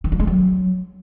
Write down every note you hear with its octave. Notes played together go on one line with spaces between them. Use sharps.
D#3
F3
G#3
F#3